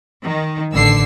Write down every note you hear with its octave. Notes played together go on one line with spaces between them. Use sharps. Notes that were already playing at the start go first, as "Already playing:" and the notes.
D#3
A1 D3 E6 C7